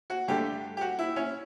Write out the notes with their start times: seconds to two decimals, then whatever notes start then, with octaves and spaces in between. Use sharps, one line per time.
0.10 F#4
0.28 G2 D3 A3 G4
0.77 G4
0.81 F#4
0.99 E4
1.16 C#4